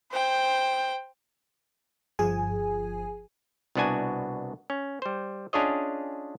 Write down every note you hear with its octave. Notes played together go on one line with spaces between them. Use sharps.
C5 G5
G1 F3 G#4 G#5
C2 B2 B3 D4 F#4 G#5
C#4
G3 C5
C#4 D4 F4 G#4 C#5 D#5